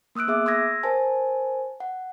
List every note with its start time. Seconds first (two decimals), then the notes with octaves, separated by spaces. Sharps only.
0.15 A#3 D#6 E6 F#6 D7
0.28 B3 G#4 E5 D6
0.46 C6 D#6 E6 G#6 A#6
0.83 A#4 C5 G#5 A5
1.80 F#5